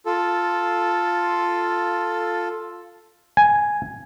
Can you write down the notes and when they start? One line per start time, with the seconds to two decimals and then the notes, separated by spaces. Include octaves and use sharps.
0.06 F4 A4
3.37 G#5